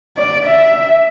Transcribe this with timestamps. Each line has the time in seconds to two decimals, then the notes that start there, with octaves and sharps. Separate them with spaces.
0.17 D5
0.46 E5